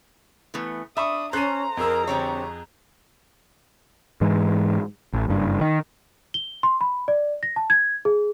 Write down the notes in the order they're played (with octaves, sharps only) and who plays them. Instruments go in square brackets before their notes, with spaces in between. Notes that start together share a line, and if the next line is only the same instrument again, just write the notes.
[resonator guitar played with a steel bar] E3 A3 B3
[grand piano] D4 B5 C#6 [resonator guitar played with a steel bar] E5 [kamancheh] D#6
[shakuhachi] C#4 [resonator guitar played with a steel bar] A4 C5 [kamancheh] A#5 [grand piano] F#6 D#7
[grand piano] F2 G#4 E6 [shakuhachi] A#4
[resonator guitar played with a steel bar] D3 G3 C#5 [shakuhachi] C4
[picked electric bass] G#2 E3 G#3
A1
F#1 G2
D#3
[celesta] G7
C6
B5
D5
A#6
A5
G#6
G#4